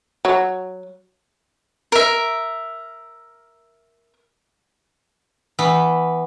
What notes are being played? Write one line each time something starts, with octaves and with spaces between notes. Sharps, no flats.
F#3
A#4 E5
E3 B3